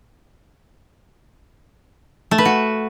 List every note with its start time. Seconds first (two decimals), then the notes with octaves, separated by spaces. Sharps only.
2.31 A3
2.38 B4
2.45 F#4